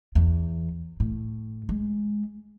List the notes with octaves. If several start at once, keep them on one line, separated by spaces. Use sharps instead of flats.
E2
A2
G#3